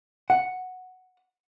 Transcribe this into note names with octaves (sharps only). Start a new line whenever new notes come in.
F#5